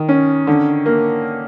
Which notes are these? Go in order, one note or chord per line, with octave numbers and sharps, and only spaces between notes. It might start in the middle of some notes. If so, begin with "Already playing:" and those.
Already playing: D#3
C#4
D3
A#3